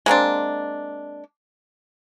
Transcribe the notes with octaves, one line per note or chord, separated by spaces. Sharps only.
G#3 A#3 C4 D4